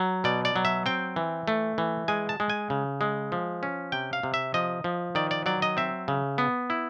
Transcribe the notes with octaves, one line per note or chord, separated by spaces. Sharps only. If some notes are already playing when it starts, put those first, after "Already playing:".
Already playing: F#3
B2 D5
D5
F#3
E5
C4 G5
E3
A3
E3
G#3 G#5
A5
G#3
G#5
C#3
G#3
F3
C#4
C3 G5
F5
C3
E5
F3 D#5
F3
D#3 D5
D5
F#3 D5
D#5
C4 E5
C#3
B3
E4